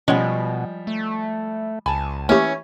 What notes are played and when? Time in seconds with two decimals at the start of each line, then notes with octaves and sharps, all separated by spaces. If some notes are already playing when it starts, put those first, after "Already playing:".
0.08 B2 F3 G3 G#3 C#4 C#5 F#5
0.87 A3
1.86 C#2 G#5 A5 B5
2.29 E3 A3 A#3 C#4 E4 G4 C#5